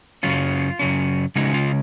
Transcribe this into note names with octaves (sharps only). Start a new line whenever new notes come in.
F#2 C#3 F#3 C#4 F4
F#2 C#3 F#3 C#4
C#3 G#3 C#4 D#4 F#4
F4